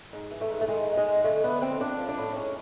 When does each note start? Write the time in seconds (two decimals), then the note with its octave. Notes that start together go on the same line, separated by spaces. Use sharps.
0.13 G#2
0.31 E3
0.41 A3
0.50 G#2
0.61 A3
0.68 D#3 G#3
0.87 G#2
0.97 G#3
1.06 G#2
1.24 D3 A3
1.43 D3 B3
1.61 F2 C4
1.80 F3 D4
1.99 F3
2.08 D4
2.18 A2
2.36 G#2 C#4